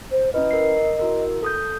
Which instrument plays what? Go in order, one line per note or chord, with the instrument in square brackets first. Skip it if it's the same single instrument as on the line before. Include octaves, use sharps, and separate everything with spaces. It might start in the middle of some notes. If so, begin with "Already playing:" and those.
[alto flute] C5
[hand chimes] C#4 E4 B4 [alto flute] D#5
[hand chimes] A#4 C7
E4 F#4 A#4
A4 D#6 G6